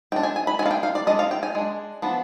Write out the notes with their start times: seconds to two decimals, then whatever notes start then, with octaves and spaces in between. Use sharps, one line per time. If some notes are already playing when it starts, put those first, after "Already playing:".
0.12 G#3 G5
0.16 D4
0.23 G#5
0.36 G#5
0.47 B5
0.59 G#3 G#5
0.63 D4 F5
0.71 G5
0.83 F5
0.95 D5
1.07 G#3 D4 D#5
1.19 F5
1.31 G5
1.43 G#5
1.55 G#3 D4
2.02 F3 B3 D4